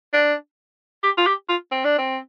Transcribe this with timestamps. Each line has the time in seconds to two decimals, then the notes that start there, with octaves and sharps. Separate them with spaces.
0.13 D4
1.03 G4
1.17 F4
1.26 G4
1.49 F4
1.71 C4
1.85 D4
1.98 C4